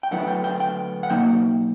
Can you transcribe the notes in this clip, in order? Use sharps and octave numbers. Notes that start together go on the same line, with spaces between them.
G5
D2 D3 F#3 B3 E4 F#5
G5
G5
G5
F#5
B2 F#3 A#3 D#4 G5